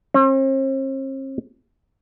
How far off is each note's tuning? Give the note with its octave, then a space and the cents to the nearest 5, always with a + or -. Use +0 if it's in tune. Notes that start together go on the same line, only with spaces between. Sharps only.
C4 +45